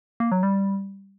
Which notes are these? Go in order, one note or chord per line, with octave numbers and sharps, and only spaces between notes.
A#3
F#3
G3